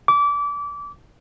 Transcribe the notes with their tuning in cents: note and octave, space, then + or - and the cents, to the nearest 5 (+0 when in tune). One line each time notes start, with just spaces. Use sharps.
D6 -25